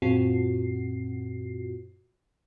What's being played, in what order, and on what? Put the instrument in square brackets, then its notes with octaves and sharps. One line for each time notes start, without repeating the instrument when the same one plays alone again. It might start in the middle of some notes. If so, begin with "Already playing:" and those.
[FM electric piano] F#2 A#2 C4 F4 F#4 C7